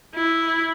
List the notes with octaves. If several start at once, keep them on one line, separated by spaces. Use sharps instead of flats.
E4